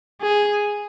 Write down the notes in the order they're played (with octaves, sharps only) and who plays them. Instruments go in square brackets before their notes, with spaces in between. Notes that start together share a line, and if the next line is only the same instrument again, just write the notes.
[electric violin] G#4